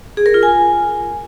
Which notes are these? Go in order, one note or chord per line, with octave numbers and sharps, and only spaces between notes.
G#4
A#4
F4
G#5